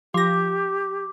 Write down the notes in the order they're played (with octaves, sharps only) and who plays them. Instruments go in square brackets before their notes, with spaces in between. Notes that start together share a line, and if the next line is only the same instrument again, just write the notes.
[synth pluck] F3 A#6 [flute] G4 [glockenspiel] D6